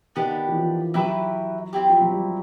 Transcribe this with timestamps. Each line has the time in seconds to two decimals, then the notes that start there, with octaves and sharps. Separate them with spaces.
0.16 D#3 B3 D4 G4
0.49 E3
0.56 F3
0.94 F#3 E4 G4 B4 E5
1.73 C4 E4 G4
1.90 F3
2.02 F#3
2.13 G3